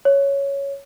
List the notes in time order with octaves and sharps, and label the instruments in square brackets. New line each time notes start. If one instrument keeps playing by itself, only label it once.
[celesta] C#5